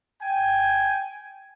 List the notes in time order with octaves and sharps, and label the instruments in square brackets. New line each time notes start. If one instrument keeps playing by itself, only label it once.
[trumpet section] G5 G#5